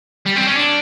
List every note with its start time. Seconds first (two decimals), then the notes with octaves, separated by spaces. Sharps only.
0.26 G3
0.36 C4
0.47 C#4
0.56 D4